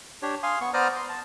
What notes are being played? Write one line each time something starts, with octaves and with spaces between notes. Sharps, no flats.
D4 G4 C#5
F5 G#5 C6 D#6
B3 C#6
B3 C5 D5 A#5 D#6 F6
C6
A5